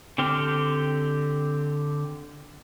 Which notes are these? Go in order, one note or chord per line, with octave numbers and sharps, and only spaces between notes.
D3 C4 G4 F6